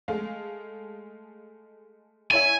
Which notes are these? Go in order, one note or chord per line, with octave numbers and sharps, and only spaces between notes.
G#3 A3 F5
E4 C#5 E5 G#5